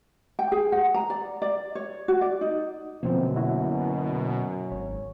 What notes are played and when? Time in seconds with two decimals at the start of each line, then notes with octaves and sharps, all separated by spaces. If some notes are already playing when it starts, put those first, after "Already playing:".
0.39 G5
0.52 G#4
0.72 F#5
0.94 A#5
1.10 D5
1.42 D5
1.75 C#5
2.08 F#4
2.21 D5
2.41 D#4
3.03 F#2 B2 D3 F3 A#3 C4
3.36 E4 F#4
4.72 G#1 C#5